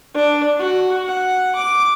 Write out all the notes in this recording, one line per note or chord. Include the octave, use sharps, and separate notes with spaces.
D4
F#4
F#5
D6